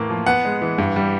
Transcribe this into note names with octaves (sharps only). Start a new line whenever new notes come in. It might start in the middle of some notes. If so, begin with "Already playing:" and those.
Already playing: A2 E3 A#3
F3
B3 F#5
G#3
E3
G2
G3